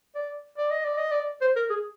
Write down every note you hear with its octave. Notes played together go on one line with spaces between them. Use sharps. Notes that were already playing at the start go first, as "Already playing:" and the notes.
D5
D5
D#5
D5
D#5
D5
C5
A#4
G#4